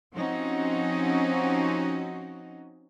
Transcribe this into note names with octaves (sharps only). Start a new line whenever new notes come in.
F3 C4 C#4 D#4 F#4